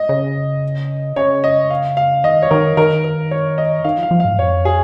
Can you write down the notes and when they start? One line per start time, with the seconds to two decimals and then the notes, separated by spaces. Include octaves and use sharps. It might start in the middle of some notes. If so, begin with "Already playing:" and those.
Already playing: D#5
0.09 C#3
1.16 C#3 C#5
1.44 D#5
1.70 F5
1.97 F5
2.24 D#3 D#5
2.42 C#5
2.51 D#3 A#4
2.77 D#3 A#4
3.04 A#4
3.31 C#5
3.58 D#5
3.84 D#3 F5
3.98 F3
4.03 F5
4.11 F3
4.20 F5
4.25 G#2
4.38 F2 C#5
4.65 G#4